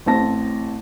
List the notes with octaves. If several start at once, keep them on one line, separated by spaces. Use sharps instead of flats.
A1 C4 A5 A#6